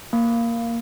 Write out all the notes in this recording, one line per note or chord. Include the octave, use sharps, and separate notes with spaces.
A#3